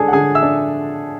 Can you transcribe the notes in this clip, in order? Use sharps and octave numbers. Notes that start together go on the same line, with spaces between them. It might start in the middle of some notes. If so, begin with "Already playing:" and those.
Already playing: D3 G#3 D4 G#4 A4 G#5 A5
F#5
D3 G#4 G#5
E5 E6
D4